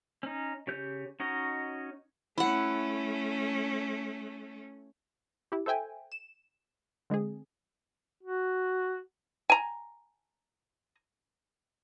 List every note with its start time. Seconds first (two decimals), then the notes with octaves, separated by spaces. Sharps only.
0.23 C#4 D#4
0.67 C#3 G4 C#5 G6
1.20 C#4 D#4 F#4 C#5 D#5
2.38 A3 C#4 E4 F#5
5.52 E4 G4
5.66 A4 C5 E5 G5 G#5
6.12 E7
7.10 D3 G#3 C4 G#4
8.23 F#4
9.50 G#5 A#5